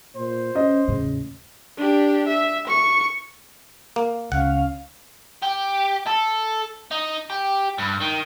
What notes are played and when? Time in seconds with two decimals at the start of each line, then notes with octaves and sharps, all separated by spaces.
0.16 A#2 C5
0.55 C#4 D#5
0.88 E2 A2 C#3
1.77 D4 G4
2.28 E5
2.68 C#6 C#7
3.96 A#3
4.32 C#2 C#4 F5 F#5
5.43 G4
6.07 A4
6.91 D#4
7.30 G4
7.79 G2
8.02 D#3